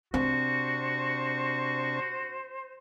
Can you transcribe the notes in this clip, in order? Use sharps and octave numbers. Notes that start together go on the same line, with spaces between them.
C3 C4 D4 F#4 C5 C#6